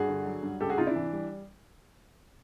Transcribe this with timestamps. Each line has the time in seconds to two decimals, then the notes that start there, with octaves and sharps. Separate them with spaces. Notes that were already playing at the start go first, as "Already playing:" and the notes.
Already playing: G2 F#4 G#4
0.08 D3
0.26 F#3
0.43 G2
0.60 C#2 G4 A4
0.69 F#4 G#4
0.78 C3 D#4 F4
0.87 D4 E4
0.96 E3
1.13 G3